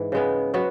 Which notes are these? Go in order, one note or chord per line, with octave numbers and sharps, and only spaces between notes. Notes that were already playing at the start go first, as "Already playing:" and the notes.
Already playing: G#2 E3
C#3 G#3 B3
F#3 B3 F#4